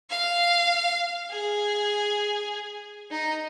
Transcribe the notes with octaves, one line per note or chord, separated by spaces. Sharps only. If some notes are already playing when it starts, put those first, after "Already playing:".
F5
G#4
D#4